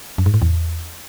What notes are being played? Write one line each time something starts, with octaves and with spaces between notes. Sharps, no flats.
F#2
G#2
A2
E2